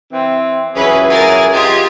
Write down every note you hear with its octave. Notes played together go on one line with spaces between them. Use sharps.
E3 C4
C#2 E3 F#3 C#4 G#4 B4
A#4 G#5 A6
F4 G4 D#5 G#6